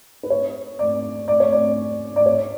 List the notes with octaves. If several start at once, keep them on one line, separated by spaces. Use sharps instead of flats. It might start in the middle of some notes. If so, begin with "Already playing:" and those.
B4
C#5
D5
D5
C#5
D5
D5
C#5